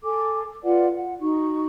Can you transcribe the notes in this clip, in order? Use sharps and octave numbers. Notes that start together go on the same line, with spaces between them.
A4 G#5 D6
F4 B4 D5 F#5
F#5
D#4 F#4 C#6